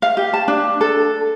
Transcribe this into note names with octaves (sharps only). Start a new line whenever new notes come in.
F5
G4
A5
D4
A4